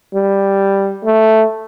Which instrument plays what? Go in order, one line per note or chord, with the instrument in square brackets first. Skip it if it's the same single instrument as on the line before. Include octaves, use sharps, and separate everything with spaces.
[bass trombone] G3
A3